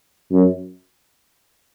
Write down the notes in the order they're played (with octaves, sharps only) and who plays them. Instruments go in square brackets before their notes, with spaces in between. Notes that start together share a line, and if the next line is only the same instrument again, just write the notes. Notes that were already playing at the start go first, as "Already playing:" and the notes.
[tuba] F#2